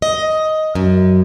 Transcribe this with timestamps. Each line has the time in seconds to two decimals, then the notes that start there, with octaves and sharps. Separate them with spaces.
0.02 D#5
0.75 F#2